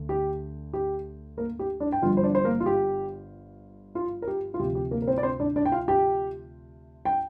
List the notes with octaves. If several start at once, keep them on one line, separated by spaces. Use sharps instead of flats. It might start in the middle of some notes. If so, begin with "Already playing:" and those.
Already playing: D2 D3
G4
G4
A#3 A#4
G4
D4 D5
G5
G1 G2 F3 F4 F5
C5
D4 D5
C5
A#3 A#4
F4
G4
F4
A#4
G4
F4
D2 C3 F3 G4
G4
A#3 A#4
A#4
C4 C5
D5
C4 C5
D4 D5
D4 D5
G5
F4 F5
G4 G5
G5